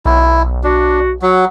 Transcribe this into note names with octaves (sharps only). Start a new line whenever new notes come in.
B1 E4
D4 F#4
F#3 F#5